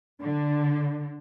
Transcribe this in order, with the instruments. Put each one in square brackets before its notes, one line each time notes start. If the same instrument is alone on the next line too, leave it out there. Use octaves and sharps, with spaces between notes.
[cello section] D3